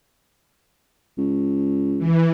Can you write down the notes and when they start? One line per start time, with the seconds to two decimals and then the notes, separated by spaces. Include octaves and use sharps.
1.18 C#2
1.99 E3